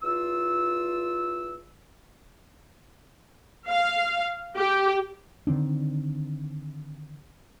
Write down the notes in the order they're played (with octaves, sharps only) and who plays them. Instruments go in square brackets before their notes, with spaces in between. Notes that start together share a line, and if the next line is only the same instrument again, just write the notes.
[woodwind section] E2 F4 E6
[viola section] F5
G4
[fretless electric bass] D3 D#3 C4 D4